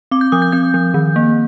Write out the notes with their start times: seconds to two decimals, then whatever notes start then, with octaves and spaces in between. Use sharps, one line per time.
0.11 C4 D6
0.21 G6
0.32 F3 D#6
0.42 G6
0.52 C4 G6
0.74 F3
0.94 D#3
1.16 A#3